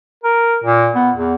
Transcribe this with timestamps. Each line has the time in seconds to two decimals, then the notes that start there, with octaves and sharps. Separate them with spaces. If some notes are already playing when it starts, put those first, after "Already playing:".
0.24 A#4
0.64 A#2
0.95 B3
1.16 E2